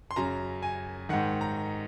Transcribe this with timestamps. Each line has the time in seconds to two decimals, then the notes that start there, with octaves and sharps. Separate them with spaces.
0.11 C6
0.16 F#2 C#3 A#5
0.62 G#5
1.09 G#2 D#3 F#5
1.41 A#5